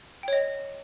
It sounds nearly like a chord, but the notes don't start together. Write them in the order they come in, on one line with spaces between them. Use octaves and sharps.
G5 C#5 D#5